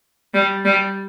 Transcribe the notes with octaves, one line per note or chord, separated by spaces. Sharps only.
G3
G3